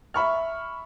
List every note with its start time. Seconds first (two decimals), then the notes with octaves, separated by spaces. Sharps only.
0.14 E5 B5 C#6 F6